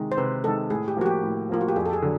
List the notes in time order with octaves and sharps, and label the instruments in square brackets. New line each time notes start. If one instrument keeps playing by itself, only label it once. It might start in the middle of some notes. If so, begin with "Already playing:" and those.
Already playing: [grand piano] C3 D#3 G#3
[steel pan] C5
[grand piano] C3 [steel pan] B4
[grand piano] D#3 G#3 [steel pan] A4
[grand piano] A2 [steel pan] G#4
[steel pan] G4
[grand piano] F3 A#3 [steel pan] F#4
[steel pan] G4
[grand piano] A2
[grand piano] F3 A#3 [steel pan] F4
[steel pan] F#4
G4
[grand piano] F2 [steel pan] G#4
[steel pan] A4
G#4
[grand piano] D3 F#3